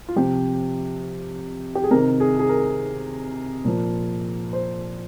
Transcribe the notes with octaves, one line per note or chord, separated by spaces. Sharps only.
F4
C3 F3 G4
G4
G#4
C3 D#3 A#4
G#4
G#4
A#4
A#2 F3
C5